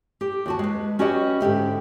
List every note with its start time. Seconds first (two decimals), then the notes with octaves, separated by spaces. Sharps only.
0.21 G4
0.46 D#2 F#4 A5
0.59 G#3 B4
0.99 C#4 F#4 G4 B4 C#5 D#5
1.40 G#2 D3 G4 E5